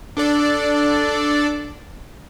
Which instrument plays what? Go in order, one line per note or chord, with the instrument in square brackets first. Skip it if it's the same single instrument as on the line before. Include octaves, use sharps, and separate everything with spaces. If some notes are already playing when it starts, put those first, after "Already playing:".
[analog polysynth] D4 A4 D5